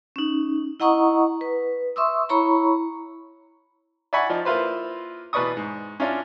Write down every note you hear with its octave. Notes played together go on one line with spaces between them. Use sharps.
C#4 D#4
E4 D#5 F#5 A#5 C#6 D#6
B4
E5 C6 C#6 D#6 E6
E4 C#5 A#5 B5 C#6
D5 E5 F#5 G#5 B5 C#6
F3 D#4 D5
A#3 E4 F4 B4 C5
B2 E3 B4 D5 C#6 D#6
G#2
C#4 D4 E4 F4 D5